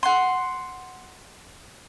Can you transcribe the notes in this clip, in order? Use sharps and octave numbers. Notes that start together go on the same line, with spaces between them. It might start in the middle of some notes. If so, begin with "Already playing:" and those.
F#5 C6